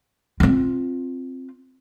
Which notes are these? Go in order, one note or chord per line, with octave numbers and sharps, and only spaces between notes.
C4 F4